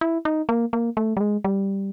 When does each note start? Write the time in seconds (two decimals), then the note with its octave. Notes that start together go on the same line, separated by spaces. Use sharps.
0.01 E4
0.25 D#4
0.49 A#3
0.73 A#3
0.97 A3
1.17 G3
1.20 G#3
1.44 G3